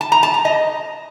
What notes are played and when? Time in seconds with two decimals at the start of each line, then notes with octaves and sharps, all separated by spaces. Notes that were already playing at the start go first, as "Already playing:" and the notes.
0.01 A5
0.12 A#5
0.23 A5
0.34 A#5
0.45 D#5